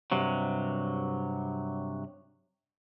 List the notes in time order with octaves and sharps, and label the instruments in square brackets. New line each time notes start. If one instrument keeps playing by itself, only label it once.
[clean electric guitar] G2 C3 F#3